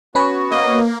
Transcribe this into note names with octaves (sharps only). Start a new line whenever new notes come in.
B3 C#4 F#4 B4 C#5
A#3 D#5